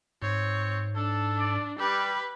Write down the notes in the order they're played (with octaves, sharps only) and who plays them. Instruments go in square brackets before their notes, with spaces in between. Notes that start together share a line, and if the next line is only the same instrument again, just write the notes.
[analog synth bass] G#2 [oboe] C4 [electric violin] C#5
[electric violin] D4 [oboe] A4
[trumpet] D5
[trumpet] G3 [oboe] G4 [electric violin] B4